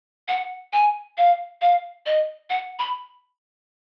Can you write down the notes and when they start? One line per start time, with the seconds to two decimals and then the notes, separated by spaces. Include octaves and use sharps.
0.28 F#5
0.73 G#5
1.18 F5
1.61 F5
2.06 D#5
2.50 F#5
2.79 B5